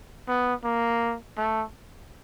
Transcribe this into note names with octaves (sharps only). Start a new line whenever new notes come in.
B3
A#3
A3